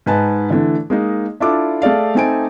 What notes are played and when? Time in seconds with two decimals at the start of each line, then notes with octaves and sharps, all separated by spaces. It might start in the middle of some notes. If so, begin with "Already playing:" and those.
0.06 G#2 D#4 B4 G#5 A5
0.50 D3 E3 A3
0.90 G#3 A#3 D#4
1.40 D4 E4 F4 A4 D6
1.82 A3 G#4 D5 F5
2.15 A3 C4 D#4 G#5 A5 D7